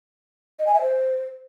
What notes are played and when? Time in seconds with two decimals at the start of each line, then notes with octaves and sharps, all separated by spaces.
0.59 D#5
0.67 G#5
0.74 E5
0.81 C5